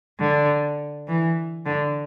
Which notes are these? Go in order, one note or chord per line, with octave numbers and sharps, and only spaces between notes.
D3
E3
D3